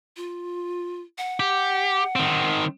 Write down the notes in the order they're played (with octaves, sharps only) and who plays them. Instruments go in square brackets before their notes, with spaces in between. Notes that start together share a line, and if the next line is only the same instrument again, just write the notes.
[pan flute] F4
F#5
[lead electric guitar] G4
D#3 C4